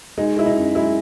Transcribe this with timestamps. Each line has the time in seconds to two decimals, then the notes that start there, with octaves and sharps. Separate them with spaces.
0.18 G#3 D#4
0.36 G#3 E4
0.46 D#4
0.56 F#2
0.75 G#3 E4